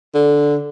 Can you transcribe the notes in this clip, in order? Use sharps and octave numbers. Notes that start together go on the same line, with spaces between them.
D3